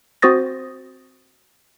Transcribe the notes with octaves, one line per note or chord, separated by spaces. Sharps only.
C4 F#4 C5 D#6 A6 A#6